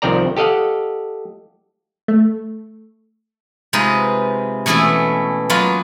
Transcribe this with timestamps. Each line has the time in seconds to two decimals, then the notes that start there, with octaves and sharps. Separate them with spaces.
0.02 C2 D#3 F3 C4 D5 A#5
0.37 G4 A4 D#5 F5 F#5
2.08 A3
3.73 C3 G#3 D#4 F4 B4
4.66 B2 E3 A3 C#4 E4 A4
5.50 F#3 G#3 A#3 F4 B4